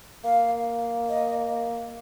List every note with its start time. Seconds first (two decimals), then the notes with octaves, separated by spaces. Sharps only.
0.24 A#3 F5
1.09 D#5